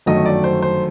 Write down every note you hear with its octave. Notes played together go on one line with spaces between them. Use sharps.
G1 F#2 D#3 F#3 A3 D#5
D5
C5
C5